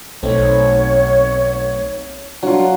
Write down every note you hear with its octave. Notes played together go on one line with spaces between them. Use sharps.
B1 A3 C4 D#4 C#5
F#3 D4 F4